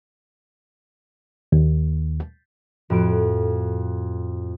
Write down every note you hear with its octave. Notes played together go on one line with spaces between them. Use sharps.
D#2
F2 A2 F#4 D7